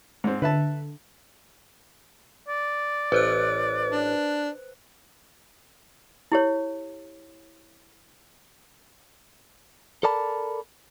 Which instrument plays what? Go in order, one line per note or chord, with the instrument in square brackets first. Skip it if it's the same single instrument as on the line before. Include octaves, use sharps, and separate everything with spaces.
[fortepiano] G#2 C4
[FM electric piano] D3 [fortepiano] B4 E5 A5
[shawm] D5
[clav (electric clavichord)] A1 [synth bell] B4 C5 F#6
[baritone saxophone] D4
[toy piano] E4 G4 C#5
[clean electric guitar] A4 A#4 D5 A5 B5